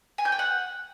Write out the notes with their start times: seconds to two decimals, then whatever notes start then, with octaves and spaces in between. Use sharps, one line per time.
0.18 G#5
0.25 G6
0.32 G5
0.39 F#5